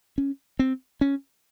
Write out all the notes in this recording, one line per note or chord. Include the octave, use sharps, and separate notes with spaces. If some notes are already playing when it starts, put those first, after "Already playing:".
C#4
C4
C#4